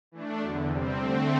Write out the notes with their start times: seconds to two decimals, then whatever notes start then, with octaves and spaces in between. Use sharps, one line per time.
0.12 E3 A3 D4
0.40 E2 D3 F#3
0.68 E2 C3 G3 C4
0.98 D3 A3 C4